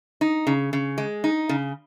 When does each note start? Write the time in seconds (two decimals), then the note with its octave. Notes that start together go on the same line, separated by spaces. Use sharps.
0.21 D#4
0.47 C#3
0.73 C#3
0.98 G#3
1.24 D#4
1.49 C#3